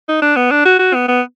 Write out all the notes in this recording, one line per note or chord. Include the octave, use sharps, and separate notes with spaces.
D#4
D4
B3
D4
F#4
F#4
B3
B3